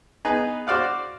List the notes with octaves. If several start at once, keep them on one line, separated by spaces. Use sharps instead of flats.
B3 D#4 G#4 B4
F#4 C5 D5 F5 F#5